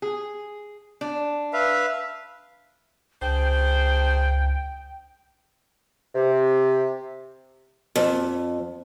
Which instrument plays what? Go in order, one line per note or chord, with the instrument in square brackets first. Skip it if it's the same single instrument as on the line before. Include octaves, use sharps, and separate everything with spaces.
[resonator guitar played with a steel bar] G#4
D4
[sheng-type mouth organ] B4 E5 F5
[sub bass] C#2 [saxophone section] D4 G#4 C5 [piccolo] G5
[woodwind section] C3
[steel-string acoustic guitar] F2